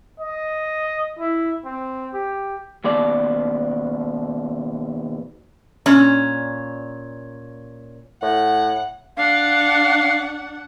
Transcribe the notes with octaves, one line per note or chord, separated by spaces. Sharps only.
D#5
E4
C4
G4
D#2 B2 D5
A#2 C#4
A2 F#5
D4 F5 F#5